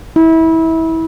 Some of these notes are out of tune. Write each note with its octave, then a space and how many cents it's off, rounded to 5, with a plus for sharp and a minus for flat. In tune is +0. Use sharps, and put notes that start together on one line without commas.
E4 -25